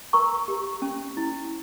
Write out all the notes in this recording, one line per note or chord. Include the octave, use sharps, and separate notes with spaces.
A#4 A#5 C#6
G4
C#4
E4